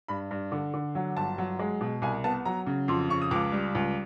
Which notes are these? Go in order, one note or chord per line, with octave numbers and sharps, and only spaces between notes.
G2 B5
G2
D3
D3
F#3
G1 A5
F#3
G#3
B2
C2 G#5
B3 A5
F#3 A#5
C#3
F2 C6
C#3 C#6
D#6
C#2 D6
G3
C#2